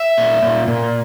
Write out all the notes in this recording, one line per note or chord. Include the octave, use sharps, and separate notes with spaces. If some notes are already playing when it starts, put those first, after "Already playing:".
Already playing: E5
A#2
A#2
A#2